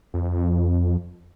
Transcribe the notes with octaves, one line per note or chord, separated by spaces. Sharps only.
F2